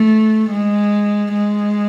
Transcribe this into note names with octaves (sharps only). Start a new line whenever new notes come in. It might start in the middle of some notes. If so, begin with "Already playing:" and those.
Already playing: A3
G#3
G#3